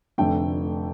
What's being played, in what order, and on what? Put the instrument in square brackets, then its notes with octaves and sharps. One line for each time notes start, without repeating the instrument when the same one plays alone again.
[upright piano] F1 F2 D3 A3 G5